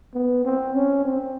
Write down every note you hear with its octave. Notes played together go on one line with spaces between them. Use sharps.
B3
C4
C#4
C4